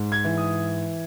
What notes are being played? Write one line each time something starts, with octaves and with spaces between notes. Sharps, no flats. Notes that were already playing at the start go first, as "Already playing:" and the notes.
Already playing: G#2
G#6
E3
D#6